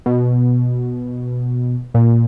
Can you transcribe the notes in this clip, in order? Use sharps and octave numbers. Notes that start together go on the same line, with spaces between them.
B2
A#2